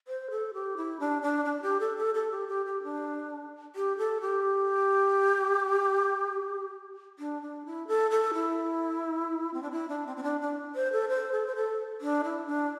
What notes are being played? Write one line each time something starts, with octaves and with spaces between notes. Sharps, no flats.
C5
A4
G4
E4
D4
D4
D4
G4
A4
A4
A4
G4
G4
G4
D4
G4
A4
G4
D4
D4
E4
A4
A4
E4
C4
D4
E4
D4
C4
C4
D4
D4
C5
A4
C5
A4
C5
A4
D4
E4
D4